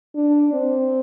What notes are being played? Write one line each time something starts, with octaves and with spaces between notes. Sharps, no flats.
D4
C4